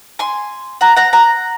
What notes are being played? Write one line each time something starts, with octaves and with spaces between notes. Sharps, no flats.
G#5 C6
F#5 A#5
F#5 A#5
F#5 A#5